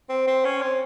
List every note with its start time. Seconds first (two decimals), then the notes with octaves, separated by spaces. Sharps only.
0.09 C4
0.27 C4
0.45 C#4
0.62 C4